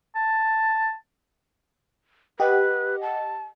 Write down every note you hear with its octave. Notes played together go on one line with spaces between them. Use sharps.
A5
G4 B4 D#5 F#5
A5